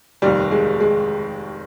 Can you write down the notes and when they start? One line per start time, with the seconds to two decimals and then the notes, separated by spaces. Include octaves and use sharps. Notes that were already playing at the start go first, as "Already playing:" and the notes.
0.22 F1 D#2 D#3 G3
0.51 G#3
0.80 G#3